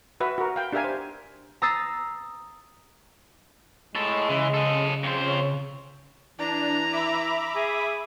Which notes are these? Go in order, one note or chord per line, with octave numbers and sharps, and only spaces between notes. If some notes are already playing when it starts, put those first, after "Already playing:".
F#4 B4 E5
F#4 A#4
F5 G5
D4 G4 A#4 E5 F5 G#5
C5
A#5 D#6 E6 A6 C7
A2 G#3 A4
C#3 E3
A4 D#5
F2 C5
C#5
E3 D4 A#5
E5 B5 D6
G#4